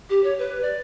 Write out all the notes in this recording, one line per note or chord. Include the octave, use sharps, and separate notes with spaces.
G4
C#5
B4
D5